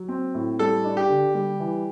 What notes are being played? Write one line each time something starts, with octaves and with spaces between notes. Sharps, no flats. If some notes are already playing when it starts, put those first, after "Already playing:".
Already playing: F#3
C4
A2
G3 A4
D4
G4
D3
G3
E3